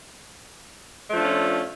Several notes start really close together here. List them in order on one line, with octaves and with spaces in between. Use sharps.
A3 F3 D4 F4 C#4